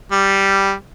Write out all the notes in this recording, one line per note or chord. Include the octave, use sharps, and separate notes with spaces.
G3